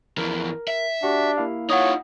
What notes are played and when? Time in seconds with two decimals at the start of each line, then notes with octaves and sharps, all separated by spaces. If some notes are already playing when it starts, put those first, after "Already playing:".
0.18 F2 E3 A#4
0.68 E5
1.03 D4 F#4 G4
1.37 A#3 E4 F5
1.70 D#4 F4 C#5 F#5 D#6